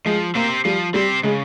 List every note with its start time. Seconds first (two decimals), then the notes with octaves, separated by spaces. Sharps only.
0.05 F3 G#3
0.35 A#3 C4 G4 C5
0.65 F3 G3
0.94 G3 C4 G4 C5
1.23 C#3 G#3